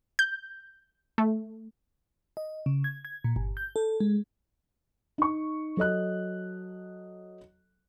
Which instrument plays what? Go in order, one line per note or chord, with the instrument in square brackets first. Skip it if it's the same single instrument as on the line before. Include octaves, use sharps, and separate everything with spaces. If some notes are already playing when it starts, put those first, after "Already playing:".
[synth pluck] G6
A3
[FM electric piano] D#5
C#3
G#6
G#6
A#2
G1
G6
A4
G#3
[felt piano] D#4 C#6
F#3 A4 D#5 F#6